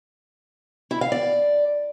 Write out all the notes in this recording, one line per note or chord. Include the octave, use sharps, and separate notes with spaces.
E4
F5
D5